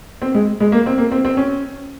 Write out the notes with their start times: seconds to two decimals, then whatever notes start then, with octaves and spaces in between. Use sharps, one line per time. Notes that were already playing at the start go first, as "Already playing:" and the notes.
0.22 C4
0.35 G#3
0.60 G#3
0.72 A#3
0.86 C4
0.98 A#3
1.12 C4
1.25 C4
1.37 C#4